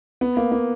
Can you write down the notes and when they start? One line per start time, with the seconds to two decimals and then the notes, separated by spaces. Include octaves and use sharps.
0.21 B3
0.37 A#3
0.52 A#3